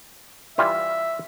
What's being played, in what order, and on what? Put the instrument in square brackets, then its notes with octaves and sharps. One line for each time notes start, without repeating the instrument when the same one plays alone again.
[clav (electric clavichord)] E3 G3 F4 [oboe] E5